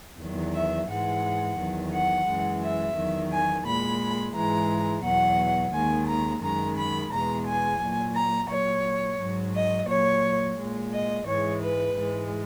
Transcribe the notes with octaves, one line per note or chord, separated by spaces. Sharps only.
E2 D#3 F#3
E5
G#2 E3 G#3 F#5
E2 D#3 F#3
F#5
F#2 E3 G#3
E5
E2 D#3 F#3
G#5
A#2 G#3 B5
G#2 E3 G#3 A#5
E2 B2 F#3 F#5
D#2 D#3 G#3 G#5
A#5
F#2 D#3 G#3 A#5
B5
E2 B2 G#3 A#5
G#5
A#2 F#3
A#5
A#2 F#3 C#5
G#2 F#3
D#5
A#2 F#3 C#5
A#2 G#3
D#5
G#2 E3 G#3 C#5
B4
G#2 E3 G#3